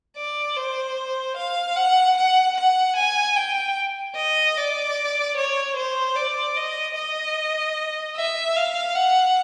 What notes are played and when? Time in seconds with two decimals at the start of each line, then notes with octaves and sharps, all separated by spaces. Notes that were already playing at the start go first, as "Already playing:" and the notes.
0.17 D5
0.57 C5
1.37 F5
1.76 F#5
2.17 F#5
2.57 F#5
2.96 G#5
3.37 G5
4.16 D#5
4.57 D5
5.37 C#5
5.76 C5
6.16 D5
6.57 D#5
6.96 D#5
8.16 E5
8.56 F5
8.95 F#5